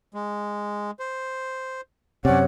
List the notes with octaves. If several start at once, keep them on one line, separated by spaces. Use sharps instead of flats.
G#3
C5
F#2 C3 C#4 C#5 D5 F#5